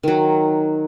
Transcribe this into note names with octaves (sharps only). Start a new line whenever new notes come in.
D#3 F#3